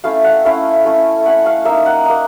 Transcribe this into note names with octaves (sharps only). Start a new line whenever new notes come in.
A3 C#4 E4 F5
F#5
A3 C#4 E4 F5
A3 C#4 E4
A3 C#4 E4 F#5
F5
A#3 D#4 E5
F#5
A#3 D#4